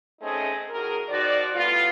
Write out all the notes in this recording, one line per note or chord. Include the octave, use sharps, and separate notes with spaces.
A3 C4 C#4 D#4 G#4 D#5
A2 F#4 G#4 A#4
D#3 F3 F#4 D5
A2 G3 B3 F4